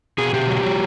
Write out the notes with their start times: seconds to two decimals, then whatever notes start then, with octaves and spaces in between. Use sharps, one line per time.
0.18 B2 G#4
0.33 B2 G4
0.48 F#3
0.63 F#3